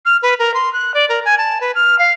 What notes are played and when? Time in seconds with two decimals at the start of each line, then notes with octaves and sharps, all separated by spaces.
0.05 F6
0.23 B4
0.39 A#4
0.54 C6
0.73 F#6
0.94 D5
1.09 A#4
1.25 G#5
1.38 A5
1.61 B4
1.75 F6
1.99 F5